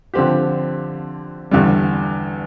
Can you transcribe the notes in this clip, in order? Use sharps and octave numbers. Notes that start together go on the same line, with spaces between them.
D3 F3 C4 G4
E2 D3 G3